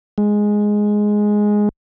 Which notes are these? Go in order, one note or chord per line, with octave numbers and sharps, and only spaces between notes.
G#3